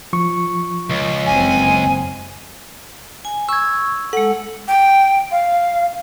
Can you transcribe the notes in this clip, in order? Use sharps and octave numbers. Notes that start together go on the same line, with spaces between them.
F3 C#6
C#2
F#1 C4 G#5
G#5
C#6 E6 G#6
G#3 A4 F#5
G5
F5